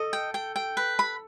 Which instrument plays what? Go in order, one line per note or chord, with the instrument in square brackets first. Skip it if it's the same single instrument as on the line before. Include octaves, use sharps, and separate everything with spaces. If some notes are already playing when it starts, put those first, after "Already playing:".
Already playing: [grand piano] A4 [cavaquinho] D#5
[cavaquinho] G5
G5
G5
B4
B5